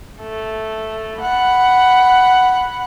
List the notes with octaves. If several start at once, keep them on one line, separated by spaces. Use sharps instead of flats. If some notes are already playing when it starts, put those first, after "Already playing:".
A3
F#5 B5